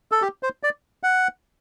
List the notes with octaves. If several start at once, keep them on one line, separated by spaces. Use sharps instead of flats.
A4
G4
C5
D5
F#5